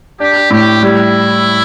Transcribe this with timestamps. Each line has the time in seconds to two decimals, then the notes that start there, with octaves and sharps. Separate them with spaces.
0.19 D4 G4
0.51 A2 G4
0.83 G3 E4